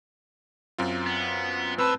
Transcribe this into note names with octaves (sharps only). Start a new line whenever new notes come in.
F#2 C4 F4
B3
A2 C4 B4 A5 E6